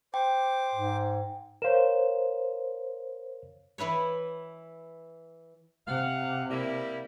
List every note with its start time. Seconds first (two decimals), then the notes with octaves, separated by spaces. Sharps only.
0.14 C5 G5 D6
0.74 G#2
1.62 A#4 C5 C#5 F5 E7
3.78 E3 E4 B4 C#5
5.88 C3 F5 F#5
6.50 G3 A#3 E4